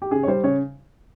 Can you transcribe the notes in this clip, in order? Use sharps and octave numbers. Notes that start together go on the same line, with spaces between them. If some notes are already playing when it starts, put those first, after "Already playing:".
G4
C#3 G#4
C#5
G3 C5
C#3 C#5